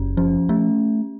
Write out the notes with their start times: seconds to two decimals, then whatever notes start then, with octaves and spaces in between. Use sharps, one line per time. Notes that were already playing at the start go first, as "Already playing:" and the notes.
Already playing: F#1 C#4
0.17 F3 C#4
0.49 A3 C#4